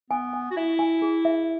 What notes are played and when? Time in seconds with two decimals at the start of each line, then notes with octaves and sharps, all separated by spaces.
0.10 B3 G#5
0.33 G#5
0.51 F#4
0.56 E4 E5
0.79 G#5
1.02 G#4
1.25 E5